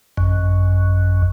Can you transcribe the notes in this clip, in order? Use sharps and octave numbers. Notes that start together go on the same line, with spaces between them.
G#1 F#2